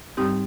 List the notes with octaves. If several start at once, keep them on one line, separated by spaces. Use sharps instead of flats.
G#2 G3 C4 D#4 G4